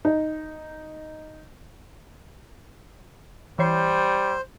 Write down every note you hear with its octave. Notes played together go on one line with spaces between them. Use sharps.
D#4
E3 G3 C5 C#5 C7